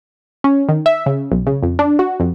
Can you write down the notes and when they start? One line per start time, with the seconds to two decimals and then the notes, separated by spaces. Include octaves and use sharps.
0.44 C#4
0.69 D#3
0.86 E5
1.06 C#3
1.32 B1
1.47 C#3
1.63 F2
1.79 D4
1.99 F#4
2.20 F2